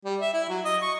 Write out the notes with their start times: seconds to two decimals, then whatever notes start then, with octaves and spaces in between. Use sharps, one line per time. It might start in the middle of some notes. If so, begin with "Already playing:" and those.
0.05 G3
0.21 E5
0.33 E4
0.49 F#3
0.65 D#5
0.82 C#6